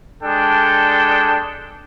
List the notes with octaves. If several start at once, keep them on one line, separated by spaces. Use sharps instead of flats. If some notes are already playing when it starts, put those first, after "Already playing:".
G#3 D4 A4 G5